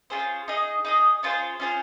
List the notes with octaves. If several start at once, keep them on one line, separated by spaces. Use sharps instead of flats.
C#4 F4 G#4 C5
D#4 G#4 D#5
D#4 G#4 D#5
C#4 F4 G#4 C5
C#4 F4 G#4 C5